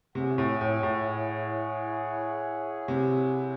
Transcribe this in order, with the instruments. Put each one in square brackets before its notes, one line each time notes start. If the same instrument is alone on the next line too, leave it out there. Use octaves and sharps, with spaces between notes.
[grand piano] C3 [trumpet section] E4 G#4 C#5 F#5
[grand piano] A2
A2
A2
C3